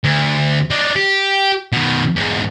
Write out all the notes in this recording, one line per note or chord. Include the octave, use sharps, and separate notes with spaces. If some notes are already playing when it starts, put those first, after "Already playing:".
D2
D4 D#4
G4
B2 D#3
E2 G#2